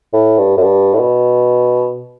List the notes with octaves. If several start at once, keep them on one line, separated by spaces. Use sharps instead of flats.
A2
G2
F#2
G2
A2
B2